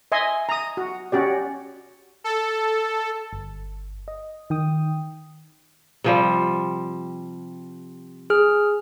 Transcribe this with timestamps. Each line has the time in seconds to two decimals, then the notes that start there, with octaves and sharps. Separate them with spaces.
0.12 D#5 E5 G#5 C6
0.49 A#5 D#6
0.77 F#4
1.12 C#4 F#4 G4 D5
2.24 A4
3.33 G1
4.08 D#5
4.50 D#3 G5 D#6
6.04 C3 F3 G3
8.30 G#4 F6